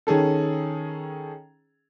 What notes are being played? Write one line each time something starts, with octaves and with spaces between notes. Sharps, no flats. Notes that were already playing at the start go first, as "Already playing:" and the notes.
D#3 C#4 G#4 A4